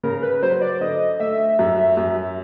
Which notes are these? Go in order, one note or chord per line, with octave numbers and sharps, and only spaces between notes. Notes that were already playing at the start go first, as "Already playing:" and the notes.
C#3 A#4
B4
F#3 C5
D5
D3 D#5
A3 E5
F#2
F#2